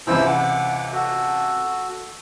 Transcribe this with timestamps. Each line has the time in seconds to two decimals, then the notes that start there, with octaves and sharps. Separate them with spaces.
0.07 C#2 C3 E3 E4 C5 E6
0.25 F#5 D6
0.93 F#4 A4